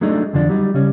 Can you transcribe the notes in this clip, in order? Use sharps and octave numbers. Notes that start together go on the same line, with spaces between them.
F#3 G#3 A3 D4 D#4
F2 D3 F3 D4
F#3 G3 D#4
C#3 G3 C#4